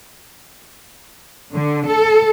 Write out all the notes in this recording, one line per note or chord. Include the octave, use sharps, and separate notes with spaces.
D3
A4